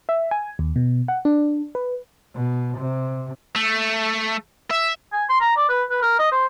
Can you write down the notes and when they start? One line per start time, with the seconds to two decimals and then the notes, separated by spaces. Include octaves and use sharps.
0.09 E5
0.31 G#5
0.59 D#2
0.76 B2
1.08 F#5
1.25 D4
1.75 B4
2.35 B2
2.78 C3
3.56 A3
4.71 E5
5.13 G#5
5.29 C6
5.41 A#5
5.56 D5
5.69 B4
5.91 B4
6.02 A#4
6.19 D#5
6.32 C5